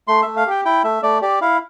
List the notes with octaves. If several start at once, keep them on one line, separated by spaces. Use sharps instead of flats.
A3 C6
A3 E5
F5
G4 G5
E4 G5
A3 E5
A3 D5
G4 D5
E4 F5